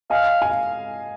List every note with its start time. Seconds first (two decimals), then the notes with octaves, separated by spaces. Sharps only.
0.10 D#5 F5 G#5
0.42 G#5
0.50 F5